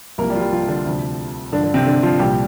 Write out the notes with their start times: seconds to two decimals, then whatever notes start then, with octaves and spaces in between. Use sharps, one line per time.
0.18 C2 C3 F3 A#3 A#4
0.30 G3 G4
0.36 F4
0.40 G3 G4
0.51 F3 F4
0.68 D3 D4
0.86 D2 C3 F3
1.52 G2 D3 D4
1.57 F3
1.63 D3 D4
1.74 C3 C4
1.86 D3 D4
2.03 F3 F4
2.19 C2 A#2 F3 G3 G4